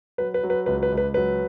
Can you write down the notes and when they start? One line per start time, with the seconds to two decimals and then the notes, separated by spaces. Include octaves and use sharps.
0.18 F#3 B4
0.34 B4
0.43 F#3
0.50 B4
0.66 C#2 B4
0.83 B4
0.92 C#2
0.97 B4
1.14 F#3 B4